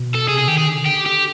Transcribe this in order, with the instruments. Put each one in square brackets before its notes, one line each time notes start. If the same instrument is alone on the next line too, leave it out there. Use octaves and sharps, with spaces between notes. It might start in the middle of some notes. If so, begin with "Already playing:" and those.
Already playing: [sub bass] B2
[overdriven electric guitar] A4
[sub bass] C3 [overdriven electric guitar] G#4
[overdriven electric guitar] G#4
[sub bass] D#3 [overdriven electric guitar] G4
[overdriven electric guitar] G#4
[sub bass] D3
[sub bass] D3 [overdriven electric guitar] G4
[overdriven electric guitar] G4